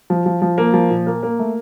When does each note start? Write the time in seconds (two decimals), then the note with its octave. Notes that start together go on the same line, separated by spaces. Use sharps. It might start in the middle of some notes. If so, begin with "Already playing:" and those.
0.10 F3
0.26 F3
0.42 F3
0.58 A#3
0.74 F3
0.90 A#2
1.07 A#3
1.23 A#3
1.39 A3